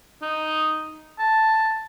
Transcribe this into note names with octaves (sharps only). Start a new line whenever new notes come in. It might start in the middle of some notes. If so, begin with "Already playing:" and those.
D#4
A5